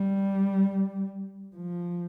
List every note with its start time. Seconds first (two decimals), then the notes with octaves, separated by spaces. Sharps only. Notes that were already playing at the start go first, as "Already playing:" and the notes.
Already playing: G3
1.56 F3